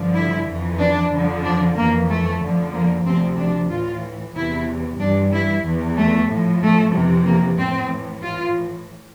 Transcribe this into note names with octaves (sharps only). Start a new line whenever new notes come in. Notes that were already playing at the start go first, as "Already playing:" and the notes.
Already playing: G2 D3 F3
E4
F2 E3
D4
F2 D3 F3
D4
F2 E3 A#3
A3
F2 D3 F3
A#3
D2 C3 F3 C4
D4
A2 E3 F4
E2 C3 E3 E4
G2 E3 D4
E4
E2 E3
A3
A2 F3
A3
F2 C3 E3
A#3
A2 E3 C4
A2 E3 F4